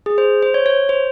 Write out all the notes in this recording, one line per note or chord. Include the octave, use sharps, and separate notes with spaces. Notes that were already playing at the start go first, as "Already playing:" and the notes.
G#4
C5
C5
C#5
C#5
C5